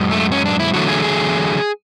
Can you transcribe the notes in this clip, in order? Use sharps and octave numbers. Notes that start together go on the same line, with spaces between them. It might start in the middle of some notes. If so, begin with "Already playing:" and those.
Already playing: F#2 G#3
A3
C#4
D4
E4
E2 D3 F#3 A3 F#4
G#4
G#4